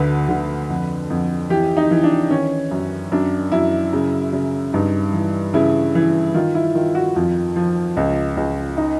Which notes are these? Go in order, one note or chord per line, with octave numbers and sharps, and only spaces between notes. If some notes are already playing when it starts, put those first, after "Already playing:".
Already playing: D2 D3 B4
D3
F2
F2
E3 G4
D#4
E3
D4
D#3 C#4
F#2
F#2 D4
F#2 E4
C#3
C#3
G2 D#4
E3
C#3 E4
E3
D#3 F4
E4
D#3 F4
F#4
F2 F4
F3
C#2
C#2
D#4